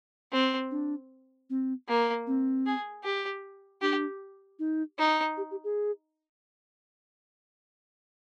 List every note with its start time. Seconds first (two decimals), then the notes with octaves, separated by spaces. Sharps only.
0.32 C4
0.71 D4
1.50 C4
1.89 A#3
2.27 C4
2.66 G#4
3.04 G4
3.82 D4 G4
4.59 D#4
4.99 D#4
5.37 G4
5.51 G4
5.64 G#4